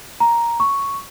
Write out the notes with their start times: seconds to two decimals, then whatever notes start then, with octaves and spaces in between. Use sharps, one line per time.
0.20 A#5
0.60 C#6